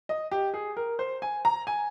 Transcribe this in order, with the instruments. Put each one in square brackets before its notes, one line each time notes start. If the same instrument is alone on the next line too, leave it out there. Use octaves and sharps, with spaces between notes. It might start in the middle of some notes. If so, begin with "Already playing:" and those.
[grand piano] D#5
G4
G#4
A#4
C5
G#5
A#5
G#5